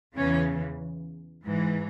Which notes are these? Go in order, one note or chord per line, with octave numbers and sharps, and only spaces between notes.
E2 C#3 E3 C#4
G#2 E3